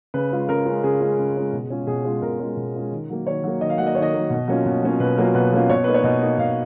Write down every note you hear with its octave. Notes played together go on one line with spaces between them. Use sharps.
C#3 B4
G#3 C#4 F4
C#3 A#4
G#3 C#4 F4
C#3 G#4
G#3 C#4 F4
C#3
G#3 C#4 F4
B2
G#3 C#4 F4
B2 G#4
G#3 C#4 F4
B2 A#4
G#3 C#4 F4
B2
G#3 C#4 F4
D#3
F#3 A#3
D#3 C#5
F#3 A#3
D#3 D#5
F5
F#3 A#3 F#5
D#5
D#3 C#5
D#5
F#3 A#3
B2
F#3 A#3 C#4 F4
B2
F#3 A#3 C#4 F4
B2 B4
F#3 A#3 C#4 F4
B2 B4
F#3 A#3 C#4 F4
B2 C#5
A#3 D#4 B4
C#5
B2 D#5
A#3 D#4
B2 F5